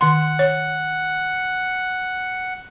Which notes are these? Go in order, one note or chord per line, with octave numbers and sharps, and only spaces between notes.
D#3 F#5 C6
C#5